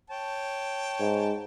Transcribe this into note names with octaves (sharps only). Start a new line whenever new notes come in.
C#5 G5 A5
G#2